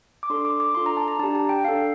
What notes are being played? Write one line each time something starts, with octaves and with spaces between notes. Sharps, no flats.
D6
D4 A4 C6
D6
D6
D4 F4 A4 C6
A#5
A5
A#5
D4 G4 A5
A5
G5
D4 A4 F5